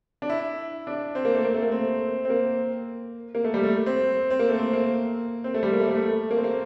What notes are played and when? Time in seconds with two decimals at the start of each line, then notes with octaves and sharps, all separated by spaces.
0.22 D4
0.30 E4
0.87 D4
1.15 C4
1.25 A#3
1.34 A3
1.44 A#3
1.54 A3
1.62 A#3
1.72 C4
2.25 C4
2.30 A#3
3.35 A#3
3.44 A3
3.54 G3
3.63 A3
3.86 C4
4.30 C4
4.39 A#3
4.49 A3
4.59 C4
4.73 A#3
5.44 C4
5.54 A3
5.63 G3
5.73 A#3
5.80 A3
5.88 G3
5.95 A3
6.31 A#3
6.37 C4
6.44 A#3